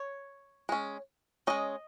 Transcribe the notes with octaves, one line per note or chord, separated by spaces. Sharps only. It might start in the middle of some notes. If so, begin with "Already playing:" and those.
Already playing: C#5
G#3 C#4
G#3 C#4 D#5